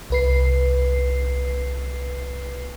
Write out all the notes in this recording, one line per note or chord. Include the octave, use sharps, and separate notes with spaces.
C2 B4 C7